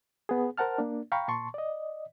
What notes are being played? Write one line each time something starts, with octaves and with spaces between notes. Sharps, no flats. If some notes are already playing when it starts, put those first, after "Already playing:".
B3 G#4
A#4 C5 F#5 A5 F6
A#3 D4
F5 G5 A#5 B5 C#6
A#2 A5 C6 C#6
D5 D#5